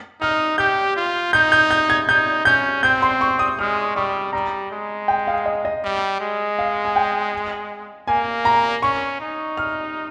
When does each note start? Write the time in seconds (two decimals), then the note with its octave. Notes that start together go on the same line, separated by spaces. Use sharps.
0.21 D#4 F6
0.58 G4 G6
0.96 F4
1.33 D#4 G6
1.52 G6
1.71 G6
1.90 G#6
2.08 D#4 G6
2.45 C#4 G6
2.83 C4 G6
3.02 C6
3.21 C#6
3.39 D#6
3.59 G#3 F6
3.96 G3 C#6
4.33 G3 A#5
4.71 G#3
5.08 G5
5.27 F5
5.45 D#5
5.65 D#5
5.84 G3
6.21 G#3
6.59 F5
6.85 G#5
6.96 G5
8.07 A#3 G#5
8.45 A#5
8.82 C#4 C#6
9.21 D#4
9.57 F6